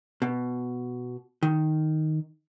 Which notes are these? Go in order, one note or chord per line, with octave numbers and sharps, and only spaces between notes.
B2
D#3